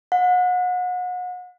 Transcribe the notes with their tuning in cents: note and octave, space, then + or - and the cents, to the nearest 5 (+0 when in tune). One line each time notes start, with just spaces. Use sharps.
F#5 -35